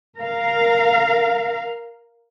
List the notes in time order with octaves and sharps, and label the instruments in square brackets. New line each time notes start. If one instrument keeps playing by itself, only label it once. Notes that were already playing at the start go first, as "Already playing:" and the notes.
[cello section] A#4 F5